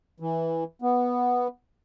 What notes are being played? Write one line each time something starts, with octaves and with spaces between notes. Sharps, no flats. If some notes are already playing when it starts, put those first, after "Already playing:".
E3
B3